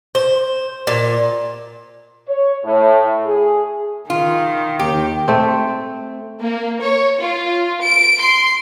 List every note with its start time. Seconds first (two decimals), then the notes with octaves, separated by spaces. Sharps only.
0.15 C5
0.87 A#2
2.28 C#5
2.64 A2
3.26 G#4
4.10 D#3 F4
4.79 D#2 G4
5.28 A3 C4
6.40 A#3
6.81 C#5
7.20 F4
7.83 D7
8.20 C6